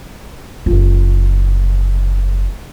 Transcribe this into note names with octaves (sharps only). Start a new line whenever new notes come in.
F#1 F4